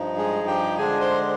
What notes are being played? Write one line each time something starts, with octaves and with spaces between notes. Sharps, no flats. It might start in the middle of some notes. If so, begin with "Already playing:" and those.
Already playing: G2 F3 D#4
G#3 G#4
G4 G5
D3 G#3 D4 G#4 G#5
C5 C6